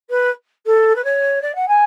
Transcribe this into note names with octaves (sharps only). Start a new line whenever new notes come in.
B4
A4
B4
C#5
D5
F#5
G#5